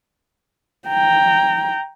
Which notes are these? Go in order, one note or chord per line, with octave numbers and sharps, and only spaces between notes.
G5 A#5